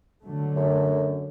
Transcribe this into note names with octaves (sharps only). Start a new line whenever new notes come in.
D3 F#3 A3
F#2